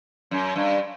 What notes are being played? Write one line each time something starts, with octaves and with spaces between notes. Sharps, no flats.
F#2
G2